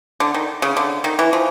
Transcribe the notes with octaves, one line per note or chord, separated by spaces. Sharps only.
D3
D#3
C#3
D3
D#3
E3
F3